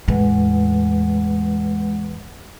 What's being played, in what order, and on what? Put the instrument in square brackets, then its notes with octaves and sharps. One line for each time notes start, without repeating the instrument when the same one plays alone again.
[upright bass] E2 A2 [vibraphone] G#3 B4 F#5